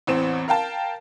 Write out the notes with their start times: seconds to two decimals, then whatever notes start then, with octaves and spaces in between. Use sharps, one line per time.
0.07 A1 E2 C4 E7
0.48 A#4 F5 G5 A5